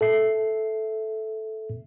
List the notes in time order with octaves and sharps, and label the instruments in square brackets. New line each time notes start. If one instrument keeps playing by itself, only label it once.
[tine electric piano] A4 E5 C7